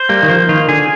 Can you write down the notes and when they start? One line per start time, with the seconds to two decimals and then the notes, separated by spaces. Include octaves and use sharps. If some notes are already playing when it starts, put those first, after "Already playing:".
Already playing: C5
0.09 G3 A#3
0.23 D#3
0.29 F3 C5
0.49 D#3 F4
0.68 D3 G#4